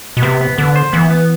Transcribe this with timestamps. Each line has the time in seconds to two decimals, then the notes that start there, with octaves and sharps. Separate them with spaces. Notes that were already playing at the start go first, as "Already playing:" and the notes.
0.17 B2
0.22 C3 B3
0.41 B3
0.58 D3 B3
0.76 C5
0.93 E3 B3
1.11 B3